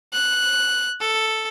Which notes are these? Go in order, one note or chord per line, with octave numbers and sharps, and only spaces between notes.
F#6
A4